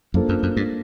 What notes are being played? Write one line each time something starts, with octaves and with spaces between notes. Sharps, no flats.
F#2 A#3 D4 F4 A4 C5
F#2
F#2
G2